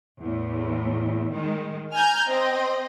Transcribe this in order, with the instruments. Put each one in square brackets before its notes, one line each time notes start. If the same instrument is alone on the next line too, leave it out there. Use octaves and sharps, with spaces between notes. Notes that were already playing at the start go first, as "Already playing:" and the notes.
[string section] E2 A2
D#3 G#3
G#5 A#5 F6 G6 G#6
C4 D#5